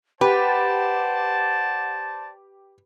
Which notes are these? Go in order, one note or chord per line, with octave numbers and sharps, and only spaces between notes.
G4 B4 C5 D5 F#5 A5